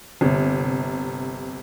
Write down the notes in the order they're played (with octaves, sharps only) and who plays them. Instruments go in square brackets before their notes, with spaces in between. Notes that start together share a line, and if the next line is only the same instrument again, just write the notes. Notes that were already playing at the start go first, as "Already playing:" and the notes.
[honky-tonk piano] G1 C3